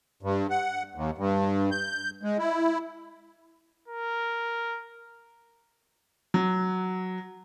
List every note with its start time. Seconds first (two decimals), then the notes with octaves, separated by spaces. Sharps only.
0.23 G2
0.50 F#5
0.95 D#2
1.18 G2
1.71 G6
2.23 G#3
2.38 E4
3.88 A#4
6.34 F#3